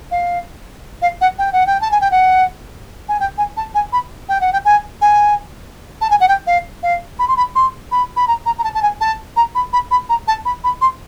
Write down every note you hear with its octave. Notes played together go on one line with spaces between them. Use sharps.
F5
F5
F#5
G5
F#5
G5
A5
G#5
G5
F#5
G#5
G5
G#5
A5
G#5
B5
G5
F#5
G5
G#5
G#5
A5
G#5
F#5
G5
F5
F5
B5
C6
B5
C6
B5
B5
A#5
A#5
A#5
A5
A5
G#5
A5
A#5
B5
B5
B5
A#5
A5
B5
B5
C6